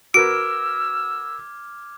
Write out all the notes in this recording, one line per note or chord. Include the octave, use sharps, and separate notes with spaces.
F#4 A#4 B4 D6 E6 F6 G#6 D7